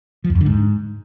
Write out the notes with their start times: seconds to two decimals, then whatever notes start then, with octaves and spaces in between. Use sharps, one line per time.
0.24 F3
0.30 E2
0.35 F2
0.41 D3
0.46 G#2